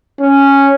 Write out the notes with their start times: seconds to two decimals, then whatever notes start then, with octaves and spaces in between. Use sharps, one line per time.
0.21 C#4